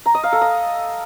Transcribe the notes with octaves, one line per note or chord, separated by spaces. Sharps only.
A#5
D#5
F5
A4
D#5